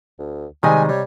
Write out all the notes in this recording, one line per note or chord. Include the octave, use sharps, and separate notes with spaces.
D2
C3 D#3 G3 G#3 D#5 G#5
G3 C#5